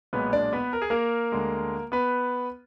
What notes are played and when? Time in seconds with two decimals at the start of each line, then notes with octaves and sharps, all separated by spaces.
0.13 B1 A#2 G#3 B3 B4
0.33 D4 D5
0.53 B3 B4
0.73 A#4
0.82 G#4
0.90 A#3 A#4
1.32 D2 D3 G#3
1.92 B3 B4